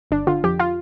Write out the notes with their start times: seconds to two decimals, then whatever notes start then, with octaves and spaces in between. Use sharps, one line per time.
0.11 G1 D4
0.27 D3 F4
0.44 F2 G4
0.59 F4